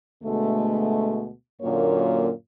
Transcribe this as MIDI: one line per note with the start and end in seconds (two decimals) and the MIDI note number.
0.23 1.31 38
0.23 1.31 47
0.23 1.31 56
0.23 1.31 57
1.62 2.30 42
1.62 2.30 46
1.62 2.30 50
1.62 2.30 54
1.62 2.30 58
1.62 2.30 73